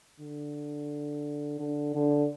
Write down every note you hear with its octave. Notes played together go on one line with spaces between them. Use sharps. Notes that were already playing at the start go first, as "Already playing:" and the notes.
D3
D3
D3